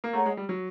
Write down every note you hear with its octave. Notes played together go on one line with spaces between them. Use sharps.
A#3
A3 G#4 C#5 F#5 A#5
G#3
G3
F#3